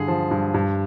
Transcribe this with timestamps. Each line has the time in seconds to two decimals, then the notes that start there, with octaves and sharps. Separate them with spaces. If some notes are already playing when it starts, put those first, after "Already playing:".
Already playing: G2 D3 G#4
0.08 F3
0.31 G2
0.54 G2